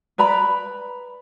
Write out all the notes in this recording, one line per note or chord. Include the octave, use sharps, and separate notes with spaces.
B4 D5 A#5 B5